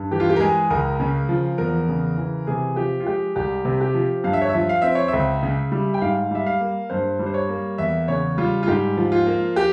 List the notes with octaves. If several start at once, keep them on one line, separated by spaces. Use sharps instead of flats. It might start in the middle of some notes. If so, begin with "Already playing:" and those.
Already playing: G2
E3 G4
F4
G4
A#4
G#3 G#4
C#2 A#4
C#3
F3
E2 A#4
C#3
E3
C3 G#4
F3 G4
F4
G#3 G4
C2 G4
C3
G4
F3
G2 F5
E5
C#5
E5
F3
F5
C4 E5
C#5
E5
C#2
C#3
G3
G5
G#2 F5
G3 E5
F5
A#3
G2 C5
G3
C5
C#5
A#3
E2 E5
C#3 C#5
G3 F4
F4
G#2 G4
F3
F4
A#3
G4